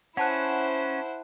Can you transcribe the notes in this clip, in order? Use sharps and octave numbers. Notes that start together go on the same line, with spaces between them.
C#4 E4 C5 F#5 A5 F#6